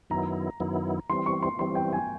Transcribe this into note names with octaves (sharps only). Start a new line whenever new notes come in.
F#2 D#3 F#3 B3 E4 A#5
F#2 D#3 F#3 B3 E4
E3 G3 C4 C6
C#6
C6
E3 G3 C4 C6
G5
G#5